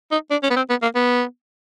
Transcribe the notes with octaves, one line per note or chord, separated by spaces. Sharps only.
D#4
D4
C#4
B3
C4
B3
A#3
B3